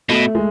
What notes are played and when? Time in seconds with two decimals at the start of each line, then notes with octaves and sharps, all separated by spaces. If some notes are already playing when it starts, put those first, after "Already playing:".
0.09 B2 A3
0.35 G#3